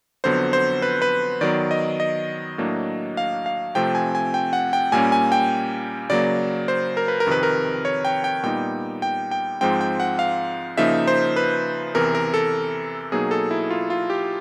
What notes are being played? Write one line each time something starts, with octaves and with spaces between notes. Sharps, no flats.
F2 D3 F#3 B3 C5
C5
B4
B4
D#3 F#3 B3 D5
D#5
D#5
A2 F#3 A#3 D4
F5
F5
C3 F3 A3 C4 G5
G#5
G#5
G5
F#5
G5
A#2 G3 A#3 C#4 G#5
G#5
G5
C#3 F#3 A#3 D5
C5
A#4
B4
A#4
F2 C3 D#3 B4
A#4
C#5
G5
G5
A#2 G3 B3 D#4 G5
G5
G5
G#2 F3 G#3 C4 G5
G5
F#5
F5
C#3 F3 A#3 D#4 E5
C5
B4
E2 C3 E3 A#4
A#4
A4
B2 F#3 A#3 D#4 G#4
A4
E4
F4
F4
G4